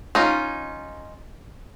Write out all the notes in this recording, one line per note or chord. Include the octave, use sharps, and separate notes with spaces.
C#4 D#4 F4